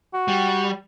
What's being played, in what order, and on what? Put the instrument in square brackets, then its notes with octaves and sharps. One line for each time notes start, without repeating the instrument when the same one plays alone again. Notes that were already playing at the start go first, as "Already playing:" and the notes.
[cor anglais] F#4
[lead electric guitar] G3